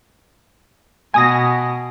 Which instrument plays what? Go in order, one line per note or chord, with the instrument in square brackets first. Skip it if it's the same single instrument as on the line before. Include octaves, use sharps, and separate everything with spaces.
[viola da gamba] B2 [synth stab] G#5 D#6 A#6